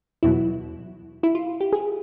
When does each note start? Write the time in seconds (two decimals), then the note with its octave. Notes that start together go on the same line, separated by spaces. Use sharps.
0.23 E2 B2 F#3 E4
1.23 E4
1.35 F4
1.60 G4
1.73 G#4